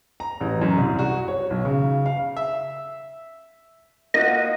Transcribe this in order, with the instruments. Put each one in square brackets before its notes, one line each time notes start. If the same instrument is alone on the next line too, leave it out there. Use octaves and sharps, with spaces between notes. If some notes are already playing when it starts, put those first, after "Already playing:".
[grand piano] A#5
A1
F#2
C2
F#4
C#5
B1
C#3
F5
[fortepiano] E5
[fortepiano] A#3 F4 F#4 [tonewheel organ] D#5